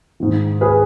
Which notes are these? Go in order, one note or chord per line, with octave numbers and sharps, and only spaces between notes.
G#2 D#3
G#4 B4